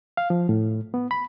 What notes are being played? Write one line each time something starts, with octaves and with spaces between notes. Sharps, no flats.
F5
F3
A2
B3
B5